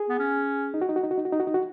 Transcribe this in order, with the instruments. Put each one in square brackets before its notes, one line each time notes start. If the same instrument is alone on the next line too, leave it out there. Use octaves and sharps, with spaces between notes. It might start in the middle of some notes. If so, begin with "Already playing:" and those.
Already playing: [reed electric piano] G#4
[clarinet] B3
C#4
[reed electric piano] D#4
F#4
D#4
F#4
D#4
F#4
D#4
F#4
D#4
F#4
D#4
F#4